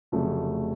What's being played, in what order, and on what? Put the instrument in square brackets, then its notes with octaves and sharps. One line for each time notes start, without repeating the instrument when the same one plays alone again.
[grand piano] F1 F2 C#3 F#3 A3